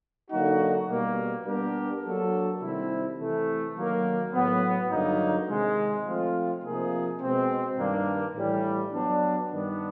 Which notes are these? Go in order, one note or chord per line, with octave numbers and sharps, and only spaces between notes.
D3 F#3 A#3 D#4 F#4
B2 G3 A#3
G3 B3 D4 G4 A#4
F#3 A#3 D4 F#4 A4
C3 D#3 G3 C4 E4
C3 E3 A3
D#3 F#3 A#3
A2 F#3 B3
G2 D3 F#3 A#3 D#4
C3 D#3 G#3
F3 A3 C4 F4
C3 F3 A#3 D#4 G#4
B2 G#3 C4
G2 D#3 G3 A#3 D4
A2 E3 G3
F#3 B3 D4
G2 D#3 G3 B3 D4